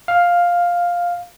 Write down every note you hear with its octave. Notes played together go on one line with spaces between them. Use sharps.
F5